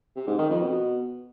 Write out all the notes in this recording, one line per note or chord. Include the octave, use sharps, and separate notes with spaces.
C3
G#2
D#3
F2
B2